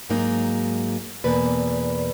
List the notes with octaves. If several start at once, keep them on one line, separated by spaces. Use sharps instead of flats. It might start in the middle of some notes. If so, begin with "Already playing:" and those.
G#2 F#3 A#3 D#4
E2 B2 A#3 B4 D5